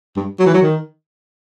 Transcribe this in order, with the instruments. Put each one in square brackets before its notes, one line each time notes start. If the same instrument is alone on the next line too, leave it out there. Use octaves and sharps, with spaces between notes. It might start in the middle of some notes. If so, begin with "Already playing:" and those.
[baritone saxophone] G2
F#3
E3
F#3
D#3